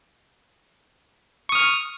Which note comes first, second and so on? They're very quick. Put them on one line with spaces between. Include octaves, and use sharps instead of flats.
C#6 D#6 F6